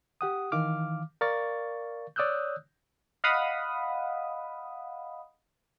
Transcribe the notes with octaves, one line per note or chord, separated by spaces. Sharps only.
G4 F#5 D#6
D#3 E3 F5 D6 F6
A#4 D5 F5 C#6 A6
C#5 D5 D#6 E6 F#6 G6
D#5 F5 F#5 B5 D#6